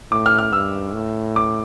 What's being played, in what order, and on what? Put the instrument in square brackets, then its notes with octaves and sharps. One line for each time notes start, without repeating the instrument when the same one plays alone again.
[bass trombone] A2 [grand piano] D6
[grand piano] F6
F6
[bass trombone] G2 [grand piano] E6
[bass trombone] A2
[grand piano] D6